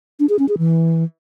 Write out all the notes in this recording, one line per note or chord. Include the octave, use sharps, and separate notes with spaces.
D4
G#4
C#4
G#4
E3